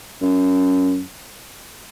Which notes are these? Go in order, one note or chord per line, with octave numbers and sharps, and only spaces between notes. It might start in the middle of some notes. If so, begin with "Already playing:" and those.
F#2